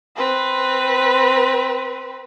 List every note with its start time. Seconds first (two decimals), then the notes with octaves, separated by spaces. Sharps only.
0.16 C4 B4